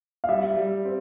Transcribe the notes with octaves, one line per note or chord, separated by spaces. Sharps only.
F5
G3 E5
G3
C4